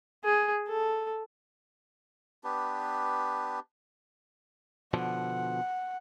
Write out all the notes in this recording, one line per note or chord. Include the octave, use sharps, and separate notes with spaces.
G#4
A4
B3 D4 G4 B4
B2 D3 F3 F#5